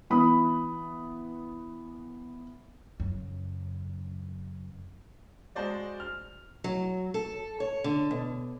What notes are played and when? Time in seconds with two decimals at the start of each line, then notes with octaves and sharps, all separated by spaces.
0.10 E3 B3 B5 D#6
3.00 F#2 C#3
5.55 G#3 F#4 C5 D5 D#5
6.00 F6
6.64 F#3
7.14 A4
7.60 C#5
7.84 D3
8.11 B2